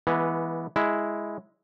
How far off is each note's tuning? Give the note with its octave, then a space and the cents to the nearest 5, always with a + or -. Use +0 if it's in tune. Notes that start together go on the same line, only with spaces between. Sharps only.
E3 +0 G#3 +0 B3 -20
G#3 +0 E4 +0